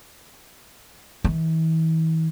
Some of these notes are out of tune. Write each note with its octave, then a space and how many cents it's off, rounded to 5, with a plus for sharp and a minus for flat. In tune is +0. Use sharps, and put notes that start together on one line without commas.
E3 -40